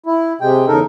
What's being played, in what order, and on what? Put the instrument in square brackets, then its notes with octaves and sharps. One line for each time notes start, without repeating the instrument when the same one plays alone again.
[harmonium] E4
C3 G#3 G5
E2 C#3 D#4 A4 A#4